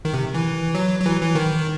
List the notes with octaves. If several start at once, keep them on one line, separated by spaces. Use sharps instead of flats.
D#3
C3
E3
F#3
F#3
E3
E3
D#3